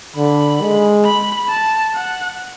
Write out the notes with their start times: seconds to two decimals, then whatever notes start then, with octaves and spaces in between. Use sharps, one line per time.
0.16 D3 B5
0.62 G#3
1.05 B5
1.49 A5
1.94 F#5